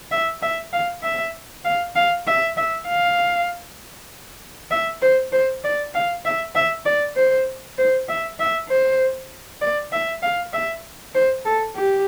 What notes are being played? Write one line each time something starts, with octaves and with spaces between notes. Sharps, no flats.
E5
E5
F5
E5
F5
F5
E5
E5
F5
E5
C5
C5
D5
F5
E5
E5
D5
C5
C5
E5
E5
C5
D5
E5
F5
E5
C5
A4
G4